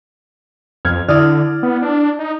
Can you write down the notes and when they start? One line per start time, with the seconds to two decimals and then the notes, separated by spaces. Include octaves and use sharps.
0.85 F2 F6 G#6
1.08 D3 E4 D5 D#6 F6
1.63 B3
1.82 D4
2.19 D#4